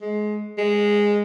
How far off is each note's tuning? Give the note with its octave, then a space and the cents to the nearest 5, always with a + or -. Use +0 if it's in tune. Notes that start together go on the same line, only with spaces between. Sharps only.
G#3 +20
G#3 -10